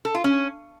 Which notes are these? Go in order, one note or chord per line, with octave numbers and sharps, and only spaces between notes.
A4
F4
C#4